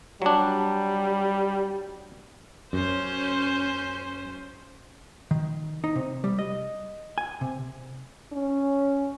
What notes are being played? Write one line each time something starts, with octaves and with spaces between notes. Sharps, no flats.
F#3 G3 D4
F#2 C#4 C5
D#3
D#4
C3
G3
D#5
G#5
C3
C#4